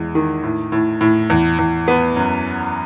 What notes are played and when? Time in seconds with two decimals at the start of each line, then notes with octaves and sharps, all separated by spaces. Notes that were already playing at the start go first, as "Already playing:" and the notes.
Already playing: E2 G#3
0.15 D#3
0.43 A2
0.72 A2
1.01 A2
1.30 E2
1.59 E2
1.88 B3
2.16 F#2